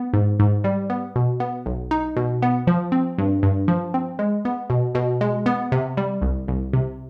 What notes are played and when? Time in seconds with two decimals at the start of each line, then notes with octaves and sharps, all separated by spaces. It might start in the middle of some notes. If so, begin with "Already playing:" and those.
Already playing: B3
0.14 G#2
0.40 G#2
0.64 G3
0.90 B3
1.16 B2
1.40 B3
1.66 B1
1.91 D#4
2.17 B2
2.42 B3
2.67 F3
2.92 C4
3.18 G2
3.43 G2
3.68 F3
3.94 C4
4.19 G#3
4.45 B3
4.70 B2
4.95 B2
5.21 G#3
5.46 B3
5.72 C3
5.97 G3
6.22 C2
6.48 C2
6.73 C3